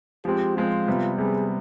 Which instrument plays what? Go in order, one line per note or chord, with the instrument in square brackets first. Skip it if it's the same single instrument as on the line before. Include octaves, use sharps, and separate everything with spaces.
[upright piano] F3 G#3 C4 [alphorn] G4
[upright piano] F3 G#3 C4 [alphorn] F4
[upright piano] C3 G3 B3
[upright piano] C3 G3 B3 [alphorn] G#4